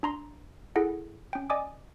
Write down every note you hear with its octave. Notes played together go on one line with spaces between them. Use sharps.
D4 A#5 C6
E4 G#4 A4 F#5
C#4 G5
D5 D#5 G#5 D6 D#6